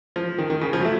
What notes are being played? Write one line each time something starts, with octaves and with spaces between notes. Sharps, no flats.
F3
D#3
D#3
C#3
F3
F#3
A3